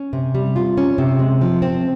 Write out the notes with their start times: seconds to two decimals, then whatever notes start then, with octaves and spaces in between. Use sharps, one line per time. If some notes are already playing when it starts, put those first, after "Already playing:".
Already playing: C#4
0.13 C3
0.35 G3
0.56 F4
0.77 C#4
0.98 C3
1.19 G#3
1.41 F3
1.62 C4